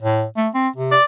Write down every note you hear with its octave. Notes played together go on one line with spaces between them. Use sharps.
A2
A3
C4
C3
D5